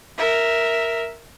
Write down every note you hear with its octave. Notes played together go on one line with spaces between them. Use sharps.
A#4 E5